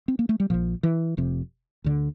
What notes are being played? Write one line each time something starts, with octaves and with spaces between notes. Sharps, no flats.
C4
A#3
A3
G3
A#1 A#2 F3
E3
F1 F2 C3
D2 D3